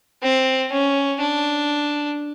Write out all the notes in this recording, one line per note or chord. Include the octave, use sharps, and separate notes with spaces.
C4
C#4
D4